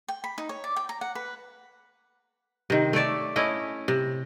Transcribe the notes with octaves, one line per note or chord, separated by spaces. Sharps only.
G5
B5
D#4
C#5
D5
G5
A#5
F#5
B4
C3 D#3
A3 C#5 D5 E5
A3 C#4 E4 D#5
C3